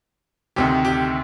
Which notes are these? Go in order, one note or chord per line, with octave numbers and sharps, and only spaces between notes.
D2 C3 D#3 G4
G4